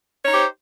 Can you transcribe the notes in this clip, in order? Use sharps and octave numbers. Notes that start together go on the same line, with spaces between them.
D#4 G4 C5 C#5